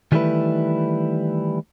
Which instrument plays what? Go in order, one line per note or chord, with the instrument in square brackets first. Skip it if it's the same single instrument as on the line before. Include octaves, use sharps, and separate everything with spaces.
[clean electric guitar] D#3 E3 G3 A3 E4 B4